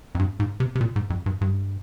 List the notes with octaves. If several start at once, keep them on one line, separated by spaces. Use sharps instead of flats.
F2
G2
G#2
C3
C3
A#2
G#2
F2
G2
G2